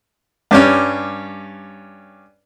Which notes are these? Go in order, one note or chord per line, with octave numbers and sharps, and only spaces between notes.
G2 G3 C#4